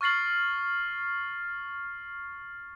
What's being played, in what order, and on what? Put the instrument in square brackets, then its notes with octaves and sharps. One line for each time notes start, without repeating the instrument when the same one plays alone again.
[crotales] C#6 F6 A6 C7 F#7